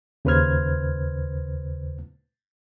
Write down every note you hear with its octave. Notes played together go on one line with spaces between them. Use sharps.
D#2 C#3 B4 C5 F6 G#6